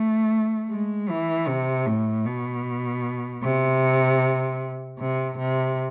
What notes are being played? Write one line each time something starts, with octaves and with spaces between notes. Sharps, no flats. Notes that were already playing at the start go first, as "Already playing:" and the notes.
Already playing: A3
G#3
E3
C3
A2
B2
C3
C3
C3